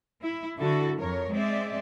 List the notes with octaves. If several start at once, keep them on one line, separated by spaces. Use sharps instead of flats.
E4
D3 E4 F#4 A4
F2 A#4 C#5
G#3 C4 D5 E5